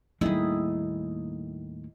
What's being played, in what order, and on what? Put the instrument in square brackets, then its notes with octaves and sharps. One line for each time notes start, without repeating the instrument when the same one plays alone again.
[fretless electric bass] D#2 A2 [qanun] D#3 E4 G#4 [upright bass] G3 A#3